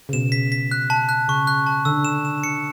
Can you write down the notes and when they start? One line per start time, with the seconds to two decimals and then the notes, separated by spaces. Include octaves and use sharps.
0.09 C#3
0.13 B2 E7
0.32 B6
0.52 B6
0.71 F#6
0.90 A5
1.09 F#6
1.28 C#3 C#6
1.47 F#6
1.66 A5
1.85 D3 E6
2.05 E7
2.25 E7
2.44 C#7